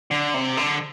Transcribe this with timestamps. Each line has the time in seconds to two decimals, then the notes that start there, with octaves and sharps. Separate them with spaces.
0.11 D3
0.34 C3
0.57 D3